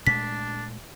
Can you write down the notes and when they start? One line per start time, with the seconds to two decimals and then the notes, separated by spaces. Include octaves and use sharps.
0.07 A#2 G#3 A3 D4 B6